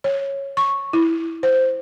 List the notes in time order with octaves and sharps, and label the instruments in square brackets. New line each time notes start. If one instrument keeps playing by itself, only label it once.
[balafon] C#5
C#6
E4
C5